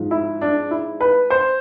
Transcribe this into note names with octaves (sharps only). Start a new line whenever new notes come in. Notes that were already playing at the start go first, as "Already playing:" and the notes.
Already playing: G#2 F3
E4
D4
E4
B4
C5